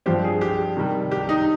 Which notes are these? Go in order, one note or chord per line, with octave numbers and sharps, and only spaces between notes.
G2 F3 C4 G4
G#4
G4
C3 D#3 G3
G4
D#4